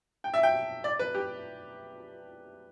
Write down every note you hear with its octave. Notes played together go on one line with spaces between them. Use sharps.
G5
E5
G5
D5
B4
G4